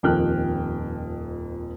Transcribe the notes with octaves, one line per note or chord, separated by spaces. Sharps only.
D#1 F2 D#3 G5 F6 F#6